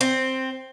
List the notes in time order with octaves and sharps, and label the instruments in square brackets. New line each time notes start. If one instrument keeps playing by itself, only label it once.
[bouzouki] C4